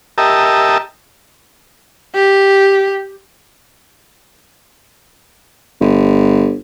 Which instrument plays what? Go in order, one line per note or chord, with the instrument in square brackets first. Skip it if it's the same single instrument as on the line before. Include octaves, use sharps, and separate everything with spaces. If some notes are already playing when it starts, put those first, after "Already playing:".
[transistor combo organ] G4 A#4 D#5 E5 A5
[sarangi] G4
[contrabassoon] G1